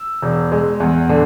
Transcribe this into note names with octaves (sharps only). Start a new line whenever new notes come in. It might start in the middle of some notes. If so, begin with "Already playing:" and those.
Already playing: E6
E1
G#3
E2
D3